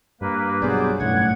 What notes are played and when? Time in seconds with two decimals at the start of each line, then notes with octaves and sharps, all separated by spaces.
0.21 G2 A#3 B4
0.62 B1 F#3 B3 G#4 C5 D5
1.00 B1 F#2 A2 D#3 F#5 G#6